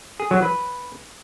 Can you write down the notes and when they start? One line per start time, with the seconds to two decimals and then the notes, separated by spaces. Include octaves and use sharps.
0.20 G#4
0.31 F#3
0.42 B4